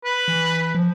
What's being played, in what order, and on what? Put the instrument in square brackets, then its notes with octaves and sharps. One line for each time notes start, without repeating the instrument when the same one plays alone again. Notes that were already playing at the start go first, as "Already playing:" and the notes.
[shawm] B4
[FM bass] E3
F3